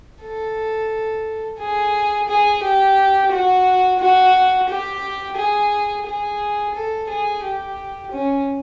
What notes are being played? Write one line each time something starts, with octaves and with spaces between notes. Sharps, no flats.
A4
G#4
G#4
G4
F#4
F#4
G4
G#4
G#4
A4
G#4
G4
C#4